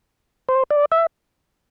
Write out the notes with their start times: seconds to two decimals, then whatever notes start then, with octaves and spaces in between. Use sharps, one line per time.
0.49 C5
0.71 D5
0.92 E5